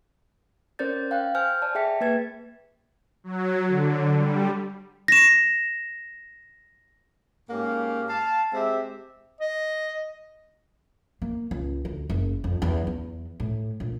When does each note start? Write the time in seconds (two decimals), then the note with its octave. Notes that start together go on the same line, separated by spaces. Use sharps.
0.79 C#4 A#4 C5 D5 G6 A6
1.11 F5 G5 F#6
1.35 C5 G#5 F6 G6
1.62 D5 G#5 A5
1.75 G#4 E5 G5 B6 C#7
2.01 A#3 G#4 B4 G#6 A6
3.24 F#3
3.67 D3
4.17 G3
5.08 A#6 E7
7.50 G#2 A#3 C#4 G4 F5
8.08 F5 A5
8.53 G#3 C4 G4 E5
9.40 D#5
11.22 A#3
11.51 C#2
11.85 D2
12.10 F#1
12.44 F2
12.62 E2
12.87 E2
13.40 A2
13.80 A#1